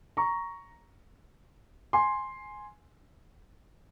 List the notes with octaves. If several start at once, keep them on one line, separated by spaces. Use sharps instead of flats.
A#5 C#6
G#5 C6